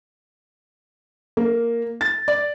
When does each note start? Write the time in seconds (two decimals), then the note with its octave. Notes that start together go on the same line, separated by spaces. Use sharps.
1.37 A#3
2.01 A6
2.28 D5